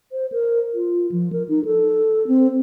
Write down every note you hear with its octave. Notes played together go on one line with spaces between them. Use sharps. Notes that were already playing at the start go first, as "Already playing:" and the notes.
C5
A#4
F4
F3
A#4
D#4
A4
C4